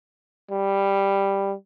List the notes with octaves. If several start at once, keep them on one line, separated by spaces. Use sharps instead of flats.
G3